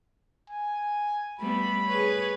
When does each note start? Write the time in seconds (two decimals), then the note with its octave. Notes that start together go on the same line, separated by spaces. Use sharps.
0.50 G#5
1.40 G3 A3 B3 B5
1.87 G#4 B4 C#5